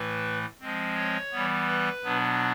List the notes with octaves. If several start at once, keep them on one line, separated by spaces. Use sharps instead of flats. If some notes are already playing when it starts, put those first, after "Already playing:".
Already playing: A2 E3 A3 B4
F3 G#3 C4
C#5
E3 G3 B3
B4
B2 F#3 B3 D4